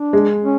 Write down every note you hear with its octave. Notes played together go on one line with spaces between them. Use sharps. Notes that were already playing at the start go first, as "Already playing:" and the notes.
Already playing: D4
G#3
C#4